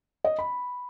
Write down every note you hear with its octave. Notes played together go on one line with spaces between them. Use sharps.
D#5
B5